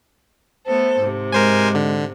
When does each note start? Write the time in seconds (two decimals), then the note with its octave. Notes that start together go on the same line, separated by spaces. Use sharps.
0.66 A3 B3 A4 C5
0.97 G#2 C3
1.32 G#3 A#4 C5 G#5
1.75 D3